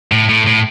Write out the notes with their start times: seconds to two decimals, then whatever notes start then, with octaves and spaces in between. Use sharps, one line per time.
0.12 A2
0.29 A2
0.46 A2